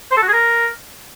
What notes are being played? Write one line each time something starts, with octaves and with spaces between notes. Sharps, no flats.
C5
A4
F#4
G#4
A#4